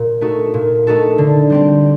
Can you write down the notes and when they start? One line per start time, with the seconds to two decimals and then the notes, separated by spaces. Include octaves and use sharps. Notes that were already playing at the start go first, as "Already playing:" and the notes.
Already playing: A#2
0.21 A3 D#4 F#4 A4
0.54 A#2
0.87 A3 D#4 F#4 A4
1.18 D3
1.50 G3 C4 G4